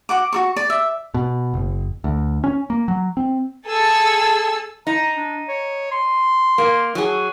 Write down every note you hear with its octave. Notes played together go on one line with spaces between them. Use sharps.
F#4 F#5 D6
F#4 A4 C#6
D5
E5
B2
F#1
D2
C#4
A#3
F#3
C4
G#4 A4 A5 E6
D#4 A#5
D4
C#5
C6
A#3
F#3 G#4